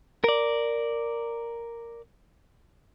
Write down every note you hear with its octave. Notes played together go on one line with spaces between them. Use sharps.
A#4 D5